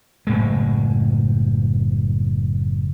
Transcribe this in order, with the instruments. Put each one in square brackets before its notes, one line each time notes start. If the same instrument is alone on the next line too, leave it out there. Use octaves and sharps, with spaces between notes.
[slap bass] F#1 A2 G#3